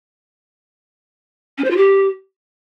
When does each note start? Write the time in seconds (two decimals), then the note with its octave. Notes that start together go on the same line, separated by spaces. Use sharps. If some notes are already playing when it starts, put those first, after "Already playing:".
1.58 C#4
1.64 C5
1.70 F4
1.77 G4